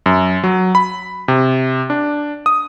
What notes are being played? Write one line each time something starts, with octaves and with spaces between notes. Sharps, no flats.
F#2
F#3
B5
C3
D4
D#6